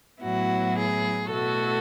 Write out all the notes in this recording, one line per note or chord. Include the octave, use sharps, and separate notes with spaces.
A2 F#3 B3 E4 F#4
G#4
B2 A3 E4 F#4 A4